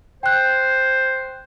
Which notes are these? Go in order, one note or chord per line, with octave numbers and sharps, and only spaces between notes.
C5 G5 F#6